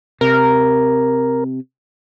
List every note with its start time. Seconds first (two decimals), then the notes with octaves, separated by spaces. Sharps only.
0.21 C3 A#4